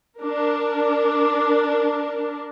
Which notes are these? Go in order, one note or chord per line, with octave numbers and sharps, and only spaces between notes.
D4 A#4